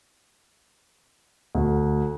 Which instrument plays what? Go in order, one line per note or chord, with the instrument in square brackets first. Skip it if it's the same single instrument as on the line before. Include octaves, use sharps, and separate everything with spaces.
[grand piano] D2